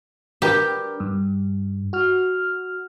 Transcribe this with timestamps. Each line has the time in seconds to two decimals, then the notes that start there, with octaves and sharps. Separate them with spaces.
0.42 D4 G4 A#4 B4
1.00 G2
1.93 F#4 F6